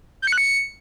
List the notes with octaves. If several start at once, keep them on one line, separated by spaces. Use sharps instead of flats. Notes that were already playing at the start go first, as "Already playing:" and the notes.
G6
C#7
F#6
C#7